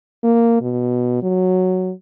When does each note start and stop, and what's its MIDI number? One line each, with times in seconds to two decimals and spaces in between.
0.23 0.58 58
0.62 1.21 47
1.23 1.93 54